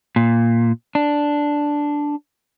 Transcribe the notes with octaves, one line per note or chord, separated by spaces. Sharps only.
A#2
D4